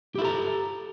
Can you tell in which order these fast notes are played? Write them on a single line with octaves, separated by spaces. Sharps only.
G4 E4 A4 A#5